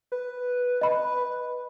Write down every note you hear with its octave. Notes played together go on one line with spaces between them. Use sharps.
B4
D#5 B5